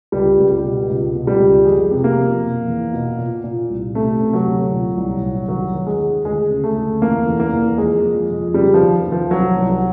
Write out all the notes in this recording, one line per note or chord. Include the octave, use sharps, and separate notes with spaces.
C#2 G3
C#2
G3
B2
C#2
B2
G3
C#2
F2 G#3
C3
A#3
F2
B2
E2
B2
A#2
A#2
C2
C3 A3
C3
F#3
D2
A#2
C2
C2
D#2 F#3
D#2
G#3
D#2
D2 G#3
C#3
A3
D2
E2 A#3
E2
A#3
E2
F2 G#3
F2
F2
C#3 G3
F3
D#2
D#2
F3
C2 F#3
C2
F#3